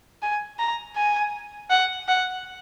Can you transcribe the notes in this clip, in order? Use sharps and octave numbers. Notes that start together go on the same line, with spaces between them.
G#5
A#5
G#5
F#5
F#5